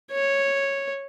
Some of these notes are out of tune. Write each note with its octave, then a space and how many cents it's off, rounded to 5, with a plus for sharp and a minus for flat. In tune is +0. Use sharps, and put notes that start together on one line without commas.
C#5 -5